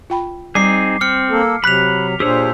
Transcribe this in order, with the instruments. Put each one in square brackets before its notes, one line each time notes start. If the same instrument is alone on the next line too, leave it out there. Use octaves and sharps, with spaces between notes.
[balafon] F4 G5 B5
[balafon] G3 [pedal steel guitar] C4 D#4 G#4 [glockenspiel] D6 C7
[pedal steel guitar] C4 [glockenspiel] F6 C#7
[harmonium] A#3 A4
[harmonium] C3 F#3 [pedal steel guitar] B5 F#6 [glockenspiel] B6 F7
[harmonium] A#2 D4 C5 [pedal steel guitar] G4 G#4 C#5 [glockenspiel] E6